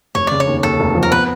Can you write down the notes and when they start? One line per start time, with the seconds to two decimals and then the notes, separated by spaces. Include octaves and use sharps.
0.15 F1 C#5
0.27 C#3 D5
0.40 C#5
0.47 D#2
0.63 D#2 A4
0.80 F1
0.95 F3
1.03 A#4
1.11 B3 B4